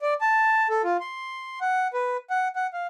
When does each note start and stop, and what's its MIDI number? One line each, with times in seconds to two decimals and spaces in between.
0.01 0.14 74
0.21 0.68 81
0.70 0.82 69
0.84 0.97 65
1.00 1.59 84
1.61 1.88 78
1.93 2.17 71
2.30 2.48 78
2.56 2.67 78
2.73 2.87 77